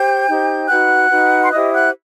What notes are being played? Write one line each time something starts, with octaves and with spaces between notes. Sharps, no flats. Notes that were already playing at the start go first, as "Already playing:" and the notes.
Already playing: G4 C5 G5 G6
D#4 G4 C5
D#4 F#4 B4 F#5 F#6
D#4 F#4 B4
C6
E4 G4 C5 D#5 D#6
F#5 F#6